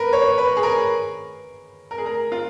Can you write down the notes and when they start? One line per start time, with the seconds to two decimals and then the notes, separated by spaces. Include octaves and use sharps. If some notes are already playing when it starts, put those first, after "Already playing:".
Already playing: A#4 B4
0.13 C#5
0.38 B4
0.57 G#4
0.63 A#4
1.91 A#4
1.98 G#4
2.06 A#4
2.32 F4